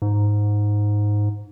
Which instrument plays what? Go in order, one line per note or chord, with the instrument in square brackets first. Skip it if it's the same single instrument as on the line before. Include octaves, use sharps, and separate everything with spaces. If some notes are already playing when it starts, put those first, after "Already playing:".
[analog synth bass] G#2